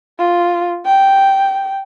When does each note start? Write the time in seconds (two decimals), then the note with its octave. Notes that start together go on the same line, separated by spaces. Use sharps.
0.19 F4
0.86 G5